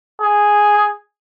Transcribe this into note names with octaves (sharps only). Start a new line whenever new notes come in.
G#4